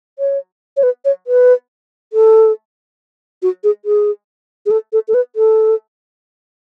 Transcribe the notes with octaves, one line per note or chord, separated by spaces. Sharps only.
C#5
C#5
B4
C#5
B4
A4
F#4
G#4
G#4
G#4
A4
A4
A4
B4
A4